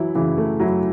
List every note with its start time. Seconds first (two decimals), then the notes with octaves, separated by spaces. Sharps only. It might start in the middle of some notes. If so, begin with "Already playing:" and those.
Already playing: E3 F#3 E4
0.15 C#3 E3
0.38 A3
0.60 F#3 E4